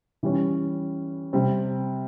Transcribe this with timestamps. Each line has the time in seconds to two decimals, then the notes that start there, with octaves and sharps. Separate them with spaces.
0.23 E3 G3 C#4
1.33 C3 G3 C4